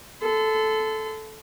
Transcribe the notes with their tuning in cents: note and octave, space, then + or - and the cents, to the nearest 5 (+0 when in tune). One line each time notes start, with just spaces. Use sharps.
A4 -10 C6 -40